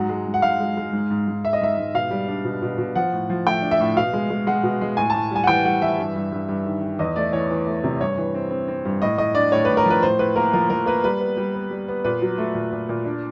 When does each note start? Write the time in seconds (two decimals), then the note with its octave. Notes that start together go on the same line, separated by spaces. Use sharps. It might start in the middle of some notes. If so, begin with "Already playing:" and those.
Already playing: G#2 F#3 F#5
0.09 G#3
0.27 G#2
0.34 F#5
0.42 G#2 F5
0.60 G#3
0.77 G#3
0.93 G#2
1.10 G#2
1.28 G#2
1.44 G#2 E5
1.53 D#5
1.61 G#2 E5
1.78 G#2
1.94 B2 F5
2.11 G3
2.28 D4
2.45 B2
2.62 B2
2.78 B2
2.96 F3 F#5
3.13 A2
3.30 F3
3.47 A3 G5
3.62 D4
3.71 E5
3.80 A2
3.96 B2 F5
4.13 G#3
4.30 G#3
4.47 G#3 F#5
4.63 B2
4.81 G#3
4.97 A2 G#5
5.10 A5
5.14 A2
5.31 G3 G#5
5.44 F#5
5.47 E3 G5
5.65 G3 F#5
5.82 E3 E5
5.98 G2
6.16 G2
6.32 G2
6.49 G2
6.65 D#3
6.83 D#3
6.99 E2 D#5
7.16 A3 D5
7.33 E3 C#5
7.51 E3
7.67 A3
7.84 C3
8.01 G2 C#5
8.18 E3
8.35 C4
8.51 C4
8.68 C4
8.85 G2
9.02 A2 D#5
9.18 A2 D#5
9.35 D4 D5
9.52 A2 C#5
9.65 B4
9.69 A2
9.77 A#4
9.86 F3 B4
10.03 A2 C5
10.19 A2 B4
10.36 A#3 A#4
10.53 F3 A#4
10.70 F3 A#4
10.86 A#3 B4
11.03 G3 B4
11.20 B3
11.37 G3
11.54 B3
11.71 G3
11.88 B3
12.04 A#2 B4
12.22 F#3
12.38 A3
12.55 A#2
12.73 A#2
12.89 A#2
13.05 D4